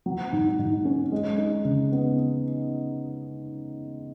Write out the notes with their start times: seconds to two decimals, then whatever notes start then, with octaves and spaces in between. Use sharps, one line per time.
0.06 F#3
0.32 G#2
0.59 G#2
0.85 C#4
1.12 G#3
1.38 D#4
1.65 C#3
1.92 B3